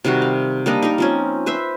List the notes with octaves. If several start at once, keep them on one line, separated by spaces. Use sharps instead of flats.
C3 D#3 G3 F#4
F5
G3 A#3 D4 D#5
D#4 A#4
F3 C4 C#4
B4 C5 E5